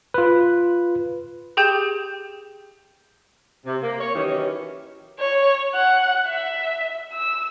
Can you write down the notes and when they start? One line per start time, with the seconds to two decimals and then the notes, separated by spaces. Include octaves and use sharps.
0.14 F4 B4
1.57 G4 G#4 G5 G6 E7
3.66 C3
3.83 A#3
3.99 C#5
4.15 D#3 E3 F#3 C#4 D#4 G4
5.20 C#5
5.75 F#5
6.27 E5
7.13 E6